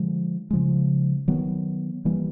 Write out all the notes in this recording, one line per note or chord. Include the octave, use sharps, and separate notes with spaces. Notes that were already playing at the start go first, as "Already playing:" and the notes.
Already playing: D3 F3 G#3
C#3 F3 G#3
D#3 F#3 B3
E3 G3 A#3